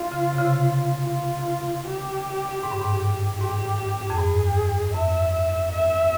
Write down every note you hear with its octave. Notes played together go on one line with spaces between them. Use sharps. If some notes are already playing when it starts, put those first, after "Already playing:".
Already playing: F4
C#3
C3
C#3
C3
F4
G4
G#2
G2
G#2
G#2 G4
F2
G2 G#4
F2 E5
E5